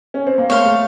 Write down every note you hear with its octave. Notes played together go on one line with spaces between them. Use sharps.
C#4
C4
A#3
A3 C#5 F5 C6
A3